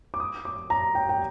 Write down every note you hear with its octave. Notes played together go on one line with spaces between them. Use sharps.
D6
D#6
D6
A#5
G5
G5